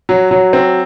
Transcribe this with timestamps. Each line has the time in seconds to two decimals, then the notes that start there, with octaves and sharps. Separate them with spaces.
0.09 F#3
0.31 F#3
0.53 C4